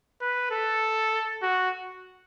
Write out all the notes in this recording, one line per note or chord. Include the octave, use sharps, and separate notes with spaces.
B4
A4
F#4